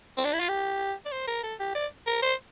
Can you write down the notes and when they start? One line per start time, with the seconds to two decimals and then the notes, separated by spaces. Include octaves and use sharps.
0.18 C4
0.25 D4
0.33 E4
0.40 F4
0.49 G4
1.06 D5
1.12 C5
1.27 A#4
1.43 A4
1.60 G4
1.75 D5
2.07 A#4
2.23 C5